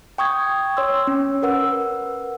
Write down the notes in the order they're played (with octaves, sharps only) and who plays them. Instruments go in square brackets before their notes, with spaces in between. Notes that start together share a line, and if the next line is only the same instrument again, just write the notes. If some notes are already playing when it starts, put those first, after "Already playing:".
[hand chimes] G5 C#6 D#6 G#6
C#5 C6 E6
C#4
A#4 B4 F#5 E6